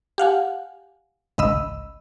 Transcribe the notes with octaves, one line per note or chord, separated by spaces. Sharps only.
G4 F5 F#5 G#5
G#1 C#2 D#5 B5 E6